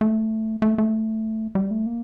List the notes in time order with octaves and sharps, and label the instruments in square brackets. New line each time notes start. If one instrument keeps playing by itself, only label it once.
[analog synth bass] A3
A3
A3
G3
A3
A#3